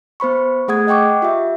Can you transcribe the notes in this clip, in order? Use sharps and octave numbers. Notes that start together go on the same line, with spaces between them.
B3 C5 B5 C#6
A3 G#4 F#5 D#6 G#6
D#5 F#5 G5 C#6 D6
F4 G4 E5